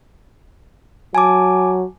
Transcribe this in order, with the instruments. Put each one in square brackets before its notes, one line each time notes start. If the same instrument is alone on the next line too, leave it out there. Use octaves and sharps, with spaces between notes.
[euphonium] F#3 [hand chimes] G#5 A5 D6